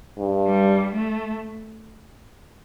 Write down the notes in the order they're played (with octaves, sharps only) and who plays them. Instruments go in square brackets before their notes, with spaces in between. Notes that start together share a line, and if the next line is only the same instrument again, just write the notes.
[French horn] G2
[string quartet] G3
A3